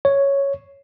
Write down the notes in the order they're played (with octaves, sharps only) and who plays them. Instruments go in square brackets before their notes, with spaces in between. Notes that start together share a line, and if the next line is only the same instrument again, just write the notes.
[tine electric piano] C#5